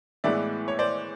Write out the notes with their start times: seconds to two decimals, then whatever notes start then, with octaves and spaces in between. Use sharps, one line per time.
0.24 A2 E3 G#3 B3 D5 E5
0.68 C#5
0.79 C5 D5